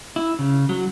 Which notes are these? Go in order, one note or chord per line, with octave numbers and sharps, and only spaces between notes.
E4
C#3
F#3